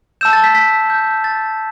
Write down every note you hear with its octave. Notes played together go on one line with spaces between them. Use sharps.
A5 E6 G6 E7
A6
B6
B6
G6
A6